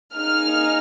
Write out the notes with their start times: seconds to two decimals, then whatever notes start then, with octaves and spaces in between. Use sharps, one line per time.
0.15 A#3 D#4 G#4 F6